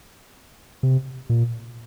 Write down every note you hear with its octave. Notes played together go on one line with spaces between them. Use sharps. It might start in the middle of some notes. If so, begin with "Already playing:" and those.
C3
A#2